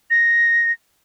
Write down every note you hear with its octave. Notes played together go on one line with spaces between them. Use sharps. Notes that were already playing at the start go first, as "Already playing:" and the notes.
A#6